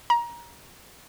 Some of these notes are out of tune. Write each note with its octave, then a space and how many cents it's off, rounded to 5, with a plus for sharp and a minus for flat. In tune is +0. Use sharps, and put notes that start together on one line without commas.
A#5 +25